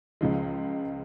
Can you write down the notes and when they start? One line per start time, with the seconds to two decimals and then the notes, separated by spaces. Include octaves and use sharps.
0.21 C#2 C#3 F3 G#3